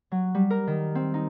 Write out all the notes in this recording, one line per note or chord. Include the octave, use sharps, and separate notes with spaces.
F#3
G3
A#4
D#3
C4
D#4